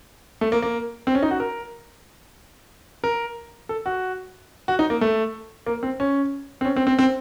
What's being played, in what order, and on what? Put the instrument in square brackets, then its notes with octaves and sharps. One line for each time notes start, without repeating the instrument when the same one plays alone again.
[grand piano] A3
A#3
A#3
C4
C#4
D#4
F#4
A#4
A#4
A4
F#4
F#4
D#4
A#3
A3
A#3
C4
C#4
C4
C#4
C4
C4
C4